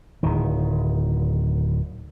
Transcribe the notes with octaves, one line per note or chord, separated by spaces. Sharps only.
D1 D#3